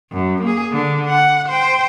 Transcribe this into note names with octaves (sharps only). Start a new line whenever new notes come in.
F#2
A#3 G#4
D3
F#5
C5 G5